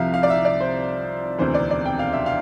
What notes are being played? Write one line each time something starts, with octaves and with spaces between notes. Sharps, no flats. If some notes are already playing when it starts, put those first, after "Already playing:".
Already playing: C2 C3 F3 E5 F5
F5
D5
E5
D5
C5
E1 D2 C3 E3 C5
D5
D5
G5
F5
E5
F5